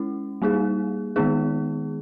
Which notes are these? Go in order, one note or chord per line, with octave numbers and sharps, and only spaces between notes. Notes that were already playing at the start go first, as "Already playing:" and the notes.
Already playing: G#3 C#4 E4
G3 A#3 D#4 G#4
D#3 G#3 B3 D#4 G#4